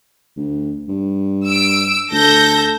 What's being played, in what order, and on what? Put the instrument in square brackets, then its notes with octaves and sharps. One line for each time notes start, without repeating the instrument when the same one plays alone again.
[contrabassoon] D2
G2
[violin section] E6 D7
[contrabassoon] D2 [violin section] A4 G6 A#6